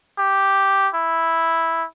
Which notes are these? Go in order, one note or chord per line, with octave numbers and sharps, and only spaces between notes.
G4
E4